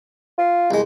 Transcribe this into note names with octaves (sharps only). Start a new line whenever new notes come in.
F4
C2 G#3